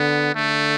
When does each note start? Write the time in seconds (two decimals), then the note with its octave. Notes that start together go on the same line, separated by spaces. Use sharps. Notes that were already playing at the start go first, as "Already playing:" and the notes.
Already playing: D3 B3
0.35 D3 A3